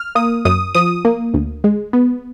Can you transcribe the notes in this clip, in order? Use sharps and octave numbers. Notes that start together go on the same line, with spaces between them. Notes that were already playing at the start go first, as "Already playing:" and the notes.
Already playing: F6
A#3 D#6
F#2 D#6
F3 D#6
A#3
D2
G#3
B3